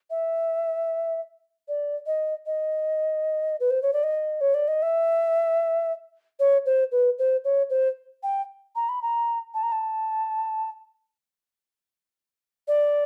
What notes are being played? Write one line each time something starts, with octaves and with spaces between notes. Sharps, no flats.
E5
D5
D#5
D#5
B4
C5
C#5
D5
D#5
C#5
D5
D#5
E5
C#5
C5
B4
C5
C#5
C5
G5
A#5
B5
A#5
A5
A#5
A5
D5